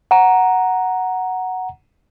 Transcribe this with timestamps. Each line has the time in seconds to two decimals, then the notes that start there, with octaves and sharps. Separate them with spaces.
0.11 F#5 A#5